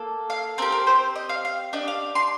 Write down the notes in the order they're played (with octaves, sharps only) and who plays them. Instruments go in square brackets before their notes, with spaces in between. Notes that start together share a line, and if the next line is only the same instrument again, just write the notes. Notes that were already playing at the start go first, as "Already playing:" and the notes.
Already playing: [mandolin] A#3 A4
F5
C4 A#4
G4
A#4
C5
D#5
F5
F5
D4 G4 D#5
F5
C6